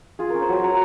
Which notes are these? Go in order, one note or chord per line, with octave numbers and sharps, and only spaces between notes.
F4 G#4
C#4 A#4
C5
F#3 G#5
F#3 A#5